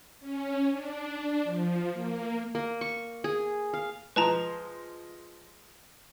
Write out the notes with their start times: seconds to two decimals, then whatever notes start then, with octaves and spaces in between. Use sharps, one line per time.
0.20 C#4
0.71 D4
1.44 F3
1.93 A#3
2.55 A#3
2.81 C#6
3.24 G#4
3.74 F5
4.16 F3 G#3 B4 A5 A#5